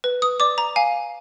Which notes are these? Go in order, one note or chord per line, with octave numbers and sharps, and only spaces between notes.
B4
D#6
D5 D6
A#5
F5 G#5